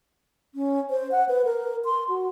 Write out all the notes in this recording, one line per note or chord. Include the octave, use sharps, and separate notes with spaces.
C#4
C5
F#5
B4
A#4
C6
F#4